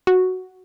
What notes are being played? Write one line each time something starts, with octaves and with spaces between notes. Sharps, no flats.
F#4